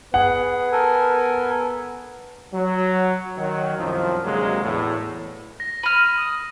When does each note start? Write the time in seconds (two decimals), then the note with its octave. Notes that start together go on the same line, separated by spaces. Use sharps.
0.14 B3 G#4 F#5
0.72 A4 A#4 G#5
2.53 F#3
3.36 D#3 F#3
3.78 C2 F#2 D#3 F3
4.24 D2 C3 F#3 G#3 A#3
4.63 E2 A2
5.60 A#6
5.83 B5 F6 D#7
6.17 D#6